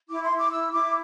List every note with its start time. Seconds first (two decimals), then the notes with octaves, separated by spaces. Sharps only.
0.10 E4 D6
0.24 C6
0.31 E4
0.38 D6
0.51 E4 E6
0.72 E4 D6